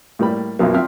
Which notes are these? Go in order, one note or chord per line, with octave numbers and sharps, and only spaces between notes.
A2 G3 A#3 B5
B1 F#2 F3 F#3 A#3
F3 C4 E5 F6